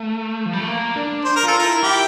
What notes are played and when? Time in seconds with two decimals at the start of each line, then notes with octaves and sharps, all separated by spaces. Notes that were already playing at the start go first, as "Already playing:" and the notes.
Already playing: A3
0.46 F3
0.53 G3
0.60 A3
0.68 A#3
0.96 D4
1.25 C5
1.36 A#4
1.44 F4 A4
1.59 E4 A#4
1.83 E4 G4